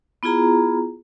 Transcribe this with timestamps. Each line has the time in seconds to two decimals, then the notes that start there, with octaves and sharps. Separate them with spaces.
0.23 B3 E4 F4 G#4 A#5